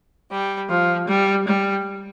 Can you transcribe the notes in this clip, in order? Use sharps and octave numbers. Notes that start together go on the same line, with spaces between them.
G3
F3
G3
G3